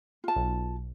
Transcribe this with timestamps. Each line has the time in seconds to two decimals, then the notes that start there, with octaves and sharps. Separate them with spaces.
0.24 F4 A5
0.36 B1